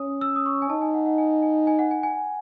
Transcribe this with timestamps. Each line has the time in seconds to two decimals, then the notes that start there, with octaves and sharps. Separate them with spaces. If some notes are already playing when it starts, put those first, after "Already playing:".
Already playing: C#4 D#6
0.21 E6
0.36 D#6
0.46 C#6
0.62 G#5
0.70 D#4 A5
0.82 G#5
0.94 F#5
1.06 F#5
1.18 G#5
1.43 G#5
1.67 G#5
1.79 F#5
1.91 G#5
2.03 G#5